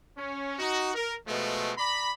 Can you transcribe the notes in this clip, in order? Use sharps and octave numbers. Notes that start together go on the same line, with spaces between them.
C#4
D#4 F#4
A#4
B2 F3 G#3 A3
D5 A#5 B5